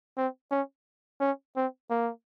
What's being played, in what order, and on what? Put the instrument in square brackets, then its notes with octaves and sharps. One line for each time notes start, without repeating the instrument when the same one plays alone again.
[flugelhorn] C4
C#4
C#4
C4
A#3